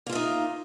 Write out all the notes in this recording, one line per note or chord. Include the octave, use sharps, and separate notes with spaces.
A#3 D#4 F4 E5